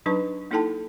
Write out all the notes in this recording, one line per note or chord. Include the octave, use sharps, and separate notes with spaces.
F#3 D4 D#4 B4 A5 C#6
A#3 D#4 E4 A4 G5 A5